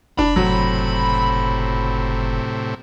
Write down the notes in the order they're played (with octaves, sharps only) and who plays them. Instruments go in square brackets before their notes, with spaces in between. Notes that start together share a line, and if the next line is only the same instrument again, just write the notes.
[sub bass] F1 [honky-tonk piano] D4 [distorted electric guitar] B5
[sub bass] F#1 [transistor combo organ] A2 C3 [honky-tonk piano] F#3